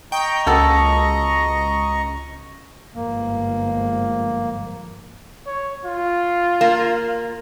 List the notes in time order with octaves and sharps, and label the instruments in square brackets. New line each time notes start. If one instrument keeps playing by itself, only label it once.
[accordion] D#5 A#5 C#6 [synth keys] G5
[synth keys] C#2 [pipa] A#3 F#4 A4
[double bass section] G1 G#2 F3 [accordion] A#3
[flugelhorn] C#5
F4
[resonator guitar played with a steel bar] A#3